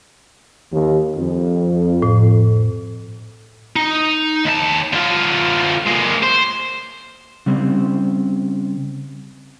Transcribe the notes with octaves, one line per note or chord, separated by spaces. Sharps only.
D#2
F2
A2
D#4
D#2 A5
D3 F4
G#3 A#3
C5
C#3 G3 C4